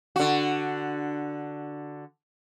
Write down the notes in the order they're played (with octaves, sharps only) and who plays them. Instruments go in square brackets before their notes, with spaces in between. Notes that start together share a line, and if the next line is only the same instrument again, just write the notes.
[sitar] D3 F#4